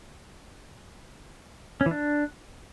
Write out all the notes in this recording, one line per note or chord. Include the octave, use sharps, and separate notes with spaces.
C#4
E3
D4